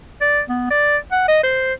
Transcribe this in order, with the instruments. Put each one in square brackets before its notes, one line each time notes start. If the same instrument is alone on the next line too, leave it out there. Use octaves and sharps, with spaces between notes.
[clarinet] D5
B3
D5
F#5
D#5
C5